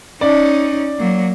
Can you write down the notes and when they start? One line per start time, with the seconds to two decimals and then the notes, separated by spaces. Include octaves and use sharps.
0.21 C#4 D#4 D5
0.99 F#3 A#3